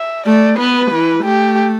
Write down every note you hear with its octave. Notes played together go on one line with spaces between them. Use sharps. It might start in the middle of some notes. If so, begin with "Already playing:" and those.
Already playing: E5
A3 D5
B3 B4
E3
A3 G4